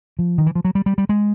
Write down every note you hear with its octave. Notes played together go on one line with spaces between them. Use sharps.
F3
D#3
E3
F3
F#3
G3
G3
G3
G#3